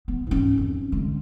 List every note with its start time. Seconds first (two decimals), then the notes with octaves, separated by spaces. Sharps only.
0.08 B3
0.27 G#2 C#4
0.57 F2
0.92 D3 G#3